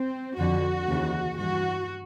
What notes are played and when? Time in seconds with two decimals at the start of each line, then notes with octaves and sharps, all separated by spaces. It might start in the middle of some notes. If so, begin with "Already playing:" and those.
Already playing: C4
0.39 F2 D3 F#4
0.88 D#2 C#3 E3
1.38 G2 E3 F#4